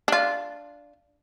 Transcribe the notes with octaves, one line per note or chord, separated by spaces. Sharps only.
D4 F4